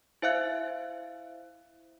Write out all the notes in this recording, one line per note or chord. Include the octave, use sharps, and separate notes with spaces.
E4 C5 E5 F5 F#6